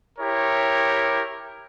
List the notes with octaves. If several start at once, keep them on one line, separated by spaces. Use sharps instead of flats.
E4 G4 A#4 C#5